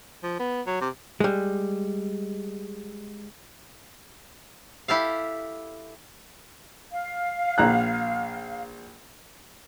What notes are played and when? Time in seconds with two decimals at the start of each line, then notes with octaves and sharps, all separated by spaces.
0.23 F3
0.40 B3
0.67 F#3
0.81 C3
1.20 G3 G#3
4.88 E4 G4 A4 F5
6.91 F5
7.58 A#1 A#5 F#6